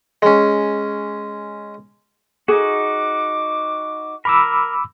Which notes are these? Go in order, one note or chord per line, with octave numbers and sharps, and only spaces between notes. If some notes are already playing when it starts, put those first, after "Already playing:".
G#3 C#4
D#4 F#4 G#4 D6
A#4 B5 D6 E6